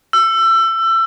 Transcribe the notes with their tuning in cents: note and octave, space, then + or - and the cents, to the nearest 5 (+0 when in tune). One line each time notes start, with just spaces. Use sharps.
E6 +25